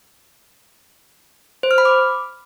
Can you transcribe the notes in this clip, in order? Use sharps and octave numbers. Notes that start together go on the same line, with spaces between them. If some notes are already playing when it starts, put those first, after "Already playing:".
C5
F6
B5
D6